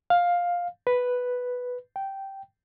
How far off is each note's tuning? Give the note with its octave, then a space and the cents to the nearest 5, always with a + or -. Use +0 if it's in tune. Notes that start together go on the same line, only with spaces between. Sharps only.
F5 +10
B4 +0
G5 -10